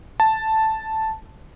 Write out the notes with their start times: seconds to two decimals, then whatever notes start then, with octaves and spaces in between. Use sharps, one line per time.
0.20 A5